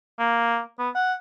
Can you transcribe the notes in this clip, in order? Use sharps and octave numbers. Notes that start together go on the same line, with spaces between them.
A#3
B3
F#5